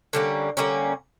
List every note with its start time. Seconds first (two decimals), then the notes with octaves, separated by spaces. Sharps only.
0.13 D3 G3 A#3 C#4
0.57 D3 G3 A#3 C#4